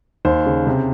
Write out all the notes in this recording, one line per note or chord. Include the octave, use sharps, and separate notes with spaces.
D#2 C5
C#3
C3